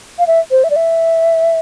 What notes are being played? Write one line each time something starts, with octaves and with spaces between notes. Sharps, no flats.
F5
E5
C5
E5
D5
E5